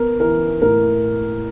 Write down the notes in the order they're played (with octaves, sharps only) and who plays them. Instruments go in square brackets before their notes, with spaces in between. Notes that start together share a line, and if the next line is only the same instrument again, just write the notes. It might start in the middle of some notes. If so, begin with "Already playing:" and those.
Already playing: [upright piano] B3 A#4
E3 A#4
A2 A#4